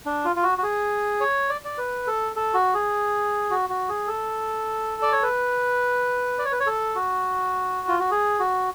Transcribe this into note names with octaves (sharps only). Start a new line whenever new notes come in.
D4
F4
F4
F#4
F#4
G#4
C#5
D5
D5
B4
A4
A4
F#4
G#4
F#4
F#4
G#4
A4
D5
C#5
B4
D5
C#5
B4
C#5
A4
F#4
F4
F#4
G#4
F#4